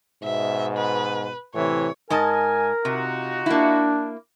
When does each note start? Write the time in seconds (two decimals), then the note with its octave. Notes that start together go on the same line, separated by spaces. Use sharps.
0.23 G#2 B2 E5
0.77 B4
1.55 A2 C3 E3 C#5
2.10 G#2 A#4 D#5 G#5 A5
2.85 C3 D#4 F4 F#4
3.46 A#3 D4 E4